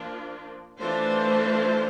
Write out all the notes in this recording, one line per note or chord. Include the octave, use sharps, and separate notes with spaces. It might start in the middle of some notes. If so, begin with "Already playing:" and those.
Already playing: F3 A#3 D4 F4
E3 A3 D4 F4 C5